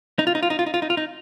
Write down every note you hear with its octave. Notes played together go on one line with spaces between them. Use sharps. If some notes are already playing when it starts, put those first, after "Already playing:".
D#4
F4
D#4
F4
D#4
F4
D#4
F4
D#4
F4
D#4